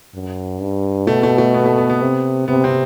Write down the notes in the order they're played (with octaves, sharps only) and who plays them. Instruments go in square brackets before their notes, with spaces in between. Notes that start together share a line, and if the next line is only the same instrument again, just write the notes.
[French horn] F#2
G2
[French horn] B2 [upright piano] A3
[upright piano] A3
A3
B3
A3
B3
B3
[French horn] C3
[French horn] C3 [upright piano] B3
[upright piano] C4